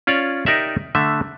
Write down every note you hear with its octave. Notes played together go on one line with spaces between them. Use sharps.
C#4 F4 C#5 D5
D#4 G4 A#4 D5 E5
D3 A3 E5